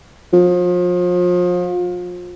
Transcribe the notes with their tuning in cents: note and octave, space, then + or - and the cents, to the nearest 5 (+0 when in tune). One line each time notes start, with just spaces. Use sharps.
F3 +35